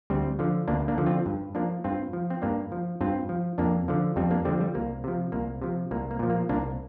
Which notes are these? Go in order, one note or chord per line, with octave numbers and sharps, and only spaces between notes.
D2 G3 C4
D3 F3
D2 A#3 D4
A#3 D4
D3 F3
C4 F4
G2
F3 A#3 D4
G2 C4 F4
F3
C4
G2 A#3 D4
F3
G2 C4 F4
F3
F2 A#3 D4
D3 F3
F2 G3 C4
A#3 D4
D3 F3 G3 C4
G3
C2 A#3
C3 F3
C2 A#3
C3 F3
C2 A#3
A#3
A#2 F3
A#3
C2 A#3 D4